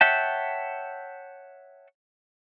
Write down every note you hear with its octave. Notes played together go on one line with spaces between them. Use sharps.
C#5 E5 F#5 G5 A5